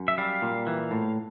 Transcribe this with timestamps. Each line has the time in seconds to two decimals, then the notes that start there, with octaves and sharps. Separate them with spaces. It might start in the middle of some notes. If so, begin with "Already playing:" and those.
Already playing: F#2
0.08 E5
0.18 G3 F5
0.42 A#2
0.67 E3
0.91 A2